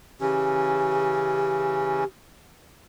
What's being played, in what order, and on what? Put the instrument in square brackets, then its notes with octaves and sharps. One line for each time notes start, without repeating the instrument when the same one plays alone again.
[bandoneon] C#3 E3 C#4 [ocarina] G4